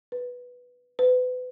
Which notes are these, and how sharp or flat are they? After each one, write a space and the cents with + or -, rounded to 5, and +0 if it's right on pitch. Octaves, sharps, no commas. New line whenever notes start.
B4 -5
B4 +35